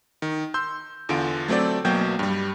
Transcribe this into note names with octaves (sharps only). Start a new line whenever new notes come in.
D#3
C6 E6 G6
E2 D3 F4 D7
F#3 A3 C4 A4 D5
B1 B2 F#3 A#3 G5 G6
G2 G3